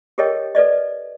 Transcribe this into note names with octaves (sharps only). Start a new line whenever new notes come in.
G4 A4 A#4 C#5 D#5 G5
A4 B4 D5 D#5